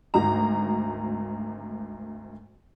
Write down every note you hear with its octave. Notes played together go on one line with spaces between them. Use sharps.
G#1 D2 A#5